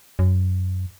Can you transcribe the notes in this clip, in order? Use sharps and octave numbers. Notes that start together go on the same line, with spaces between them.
F#2